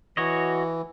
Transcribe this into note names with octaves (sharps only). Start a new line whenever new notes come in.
E3 F#4 C#5 D#5